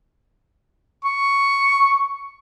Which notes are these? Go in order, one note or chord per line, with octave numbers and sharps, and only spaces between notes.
C#6